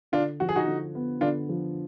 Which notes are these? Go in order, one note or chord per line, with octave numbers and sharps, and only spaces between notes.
D3 D4 F4
F3 F#4
G#4
D#4 F#4
D3
B3
D3 D4 F4
F3